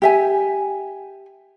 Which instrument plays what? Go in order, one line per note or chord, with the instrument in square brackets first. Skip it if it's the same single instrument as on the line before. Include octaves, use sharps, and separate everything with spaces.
[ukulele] G4 E5 G#5